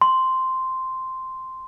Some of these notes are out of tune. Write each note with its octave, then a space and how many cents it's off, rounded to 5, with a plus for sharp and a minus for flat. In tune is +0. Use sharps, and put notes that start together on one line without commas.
C6 -5